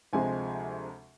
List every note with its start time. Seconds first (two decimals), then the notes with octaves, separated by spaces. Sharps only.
0.13 D2 C3 F3 G#3 C4 G#5